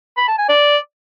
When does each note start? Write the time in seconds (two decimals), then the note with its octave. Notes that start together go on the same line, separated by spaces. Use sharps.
0.17 B5
0.28 A5
0.38 G#5
0.49 D5